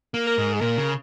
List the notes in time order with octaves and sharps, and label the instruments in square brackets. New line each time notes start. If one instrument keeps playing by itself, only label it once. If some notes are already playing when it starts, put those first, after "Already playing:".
[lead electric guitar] A#3
[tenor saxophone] A#4
[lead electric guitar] G#2
[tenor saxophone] G#4
[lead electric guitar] A#2 [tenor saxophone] A#4
[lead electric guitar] C#3